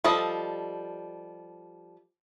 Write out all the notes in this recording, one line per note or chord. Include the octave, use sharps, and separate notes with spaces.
F3 G3 A4 D#5